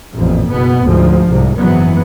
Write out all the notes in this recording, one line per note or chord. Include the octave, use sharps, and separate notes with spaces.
A1 F2 A#2
F#1 B2 B3
D2 G#2 F3
C2 G#2
F#1 G#2 E3 F#3 B3